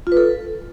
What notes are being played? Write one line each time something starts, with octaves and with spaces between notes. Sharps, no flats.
F4
B4
A4